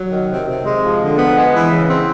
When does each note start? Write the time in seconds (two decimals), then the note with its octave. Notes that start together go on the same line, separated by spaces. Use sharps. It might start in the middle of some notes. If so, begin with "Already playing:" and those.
Already playing: F#3
0.11 D#3
0.29 C3
0.47 C3
0.65 G#3
0.83 F3
1.00 D3
1.19 B3
1.36 G#3
1.54 E3
1.71 C#3
1.89 C4